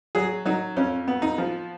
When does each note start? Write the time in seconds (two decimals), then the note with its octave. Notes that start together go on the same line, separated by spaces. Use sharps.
0.15 F#3 G#4
0.45 F#3 D#4
0.76 F2 C#4
1.08 B3
1.22 D#4
1.38 F3